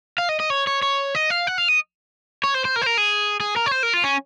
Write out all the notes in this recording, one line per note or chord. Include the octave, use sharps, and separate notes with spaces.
F5
D#5
D#5
C#5
C#5
C#5
D#5
F5
F#5
F5
D#5
C#5
C5
C5
A#4
C5
A#4
G#4
G#4
A#4
C#5
C5
A#4
F4
C#4